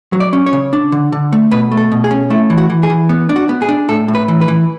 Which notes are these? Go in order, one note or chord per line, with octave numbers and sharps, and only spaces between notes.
F#3
D5
C#4
C#5
C#3
D4
D3
D3
A3
B2 B4
A3
A4
B2
G#4
C#4
A3 E4
E3
F#4
E3
G#4
E3
B3
D4
F#4
B3
G#4
D4
A2 A4
A2
B4
E3
B4
E3